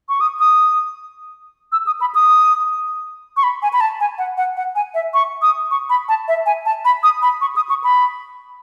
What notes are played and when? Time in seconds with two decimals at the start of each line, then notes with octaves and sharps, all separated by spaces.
0.09 C#6
0.21 D#6
0.39 D#6
1.72 E6
1.87 D#6
2.01 B5
2.15 D#6
3.37 C#6
3.43 B5
3.62 G#5
3.73 B5
3.81 A5
4.00 G#5
4.18 F#5
4.37 F#5
4.57 F#5
4.76 G#5
4.94 E5
5.14 C#6
5.42 D#6
5.71 C#6
5.90 B5
6.09 A5
6.28 E5
6.46 G#5
6.65 A5
6.85 B5
7.03 D#6
7.22 B5
7.41 C#6
7.56 D#6
7.69 C#6
7.84 B5